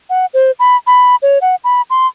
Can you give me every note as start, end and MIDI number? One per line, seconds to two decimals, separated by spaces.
0.10 0.26 78
0.34 0.51 72
0.59 0.76 83
0.87 1.16 83
1.22 1.39 73
1.42 1.55 78
1.64 1.82 83
1.90 2.07 84